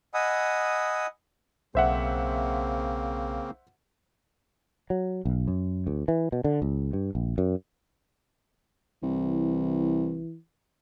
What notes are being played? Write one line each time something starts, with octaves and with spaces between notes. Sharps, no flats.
D#5 F#5 G#5 B5 D#6 E6
B1 C#3 A#3 C4 C5 E5 F#5
F#3
B1
F#2
D2
E3
B2
D3
C#2
G2
A#1
F#2
C2 E3